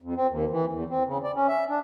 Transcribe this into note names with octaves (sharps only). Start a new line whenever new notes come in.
F2
C4
D#2
E3
E2
C4
C#3
D5
C#4
E5
D4